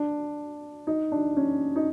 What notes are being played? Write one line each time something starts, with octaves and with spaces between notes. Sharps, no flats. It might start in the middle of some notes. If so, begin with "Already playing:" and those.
Already playing: D4
D#4
D4
C#4
D#4